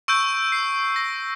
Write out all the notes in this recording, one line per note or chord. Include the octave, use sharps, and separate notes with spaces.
C#6 E6 G6 D7
C7
A#6